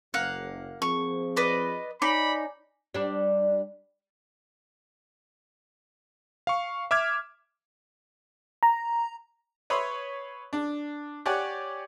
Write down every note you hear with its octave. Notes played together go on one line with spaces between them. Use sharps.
F#1 A#3 F5 F#5
F3 C4 G#4 C#6
B4 D5 D#5
D#4 C#5 D5 G#5 B5 D6
G3 D4
F5 C#6
E5 D6 F6 G#6
A#5
B4 C#5 E5 B5 C6 D#6
D4
G4 C#5 D5 F#5 G#5